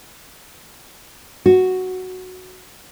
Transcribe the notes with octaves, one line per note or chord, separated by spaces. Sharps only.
F#4